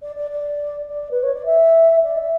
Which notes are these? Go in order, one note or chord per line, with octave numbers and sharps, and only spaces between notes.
D5
D5
D5
D5
B4
C#5
D5
E5
D5
E5